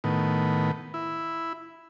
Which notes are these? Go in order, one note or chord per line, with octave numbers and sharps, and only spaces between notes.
A2 D#3 B3
E4